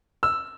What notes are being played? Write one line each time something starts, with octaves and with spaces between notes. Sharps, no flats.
E6